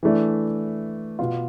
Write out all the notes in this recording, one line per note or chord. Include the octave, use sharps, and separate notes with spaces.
E3 A3 D4
B2 B3 F4